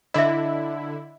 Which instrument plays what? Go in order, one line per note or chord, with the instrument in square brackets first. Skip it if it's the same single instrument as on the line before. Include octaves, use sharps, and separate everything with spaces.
[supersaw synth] D3 E4 [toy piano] D#5 E5